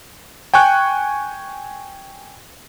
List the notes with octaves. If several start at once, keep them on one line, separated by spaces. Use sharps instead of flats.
G5 G#5 C#6 F#6